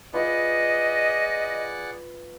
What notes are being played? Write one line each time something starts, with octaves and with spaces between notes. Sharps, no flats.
F4 G#4 B4 D5 D#5 F#5